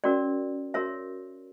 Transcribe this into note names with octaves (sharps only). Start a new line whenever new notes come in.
C#4 F#4 A#4 C#5 D5
F#4 A#4 C#5 E5